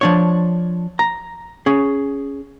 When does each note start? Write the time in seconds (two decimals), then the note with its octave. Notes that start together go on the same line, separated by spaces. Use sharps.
0.01 F3 D4 C#5
0.99 A#5
1.66 C#4 G#4